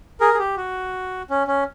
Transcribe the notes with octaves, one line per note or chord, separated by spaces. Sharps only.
G#4 A#4
G#4
G4
F#4
C#4
C#4